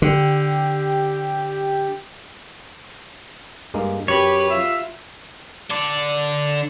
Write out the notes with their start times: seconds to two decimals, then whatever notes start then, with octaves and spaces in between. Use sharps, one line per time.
0.02 D3 G4
3.74 G2 G#3 A#3
4.08 F#2 G4 B4 C#5
4.50 F4 E5
5.70 D3 D5